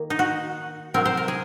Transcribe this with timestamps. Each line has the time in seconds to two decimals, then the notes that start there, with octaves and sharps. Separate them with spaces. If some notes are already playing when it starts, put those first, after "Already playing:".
Already playing: D#3 A#3
0.10 D#4
0.19 F#4
0.94 C3 F#3 C4 A#4
1.05 C5
1.17 A#4
1.28 G#4